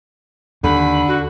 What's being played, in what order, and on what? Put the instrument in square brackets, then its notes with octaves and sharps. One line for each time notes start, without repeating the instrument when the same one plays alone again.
[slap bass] D#2 [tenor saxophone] D3 [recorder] B5
[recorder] F#4